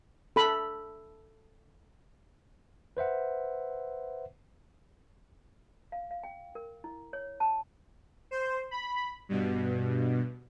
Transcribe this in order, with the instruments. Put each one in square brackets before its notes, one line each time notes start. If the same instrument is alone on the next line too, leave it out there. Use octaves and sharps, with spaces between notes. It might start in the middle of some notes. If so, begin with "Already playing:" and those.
[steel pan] A4 B5
[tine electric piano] B4 C5 E5 F#5
[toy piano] F5
F5
G5
A#4
E4
C#5
A5
[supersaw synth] C5
B5
G2 B2